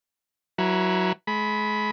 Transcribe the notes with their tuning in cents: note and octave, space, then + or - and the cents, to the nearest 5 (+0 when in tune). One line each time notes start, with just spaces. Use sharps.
F#3 +0 E4 +0 B4 -40
G#3 +35 B5 +0